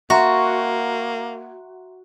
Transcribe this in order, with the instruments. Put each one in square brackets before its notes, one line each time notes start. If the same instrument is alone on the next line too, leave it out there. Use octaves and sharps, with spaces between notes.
[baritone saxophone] A#3 [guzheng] F#4 [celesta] E5 A#5 C6